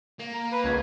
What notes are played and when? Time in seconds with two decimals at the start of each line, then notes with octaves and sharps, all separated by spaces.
0.19 A#3
0.34 A#5
0.52 B4 B5
0.64 C#2 G#6